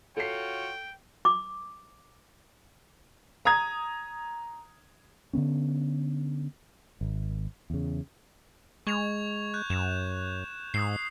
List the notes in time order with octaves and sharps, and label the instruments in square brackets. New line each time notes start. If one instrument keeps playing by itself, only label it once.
[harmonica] F4 F#4 C#5 [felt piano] A4 C7 [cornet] G5
[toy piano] D6
[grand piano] A#5 D#6 G#6
[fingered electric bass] D3 E3 B3 C#4
G#1
E2 C#3
[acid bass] G#3 [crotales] C#6 G#6 F7
[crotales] F#6 G6
[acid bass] F#2 [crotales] E7
[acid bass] G#2 [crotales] D#6 E6 C7